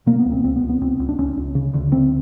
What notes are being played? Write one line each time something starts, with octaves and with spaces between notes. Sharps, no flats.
B2 A#3
B3
C#2
C4
C#2 C4
B3
C#2
B3
C#2 C4
C#2
D4
C#2 C#4
C#2
C#3
D2
D2 C4